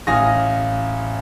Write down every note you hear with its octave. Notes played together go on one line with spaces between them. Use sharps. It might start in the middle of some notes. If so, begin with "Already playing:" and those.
A1 F5 G#5 D#6 A#6